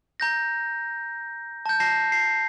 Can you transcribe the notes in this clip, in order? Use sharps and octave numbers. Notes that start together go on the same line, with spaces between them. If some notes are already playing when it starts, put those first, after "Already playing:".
A#5 G6 A#6
A5 G6
A5 A#6 C7
C7